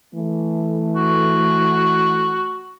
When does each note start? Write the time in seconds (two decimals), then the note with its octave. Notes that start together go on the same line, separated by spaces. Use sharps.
0.15 E3 A3
0.96 F#4